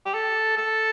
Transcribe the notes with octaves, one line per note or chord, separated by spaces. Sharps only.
G4
A4
A4